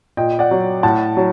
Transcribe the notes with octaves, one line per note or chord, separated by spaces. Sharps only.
A#2 D#5 G5
D5 F#5
F#3
A2 F#5 A5
F#3